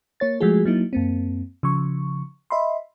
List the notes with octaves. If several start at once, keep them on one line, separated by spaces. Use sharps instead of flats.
A#3 C#5 A6
F3 G#3 A3 F#4 G#4
F#3 A#3 D#4 E4
F#2 A#3 C4
C#3 F3 C#6
D#5 E5 B5 C6